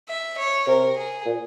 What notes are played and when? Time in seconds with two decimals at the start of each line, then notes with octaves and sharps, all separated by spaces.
0.09 E5
0.38 C#5
0.67 C3 A#4
0.97 G#4
1.25 A#2